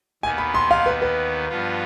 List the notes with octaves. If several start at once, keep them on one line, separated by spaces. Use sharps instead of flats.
D#2 D#3 B3 G#5
B5
C6
F5
B4
B4
G2 F3 B3 F4